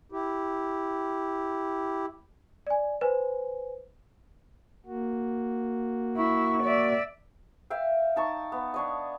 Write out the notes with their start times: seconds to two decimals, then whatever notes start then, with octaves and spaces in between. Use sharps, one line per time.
0.12 E4 G4
2.67 D5 G#5
3.01 B4 C5 G#5
4.86 A#3 F#4
6.17 E4 C#6
6.63 D5 E5
7.70 E5 F5 G5
8.16 D#4 A5 C#6
8.52 B3
8.74 D4 C#5 D#5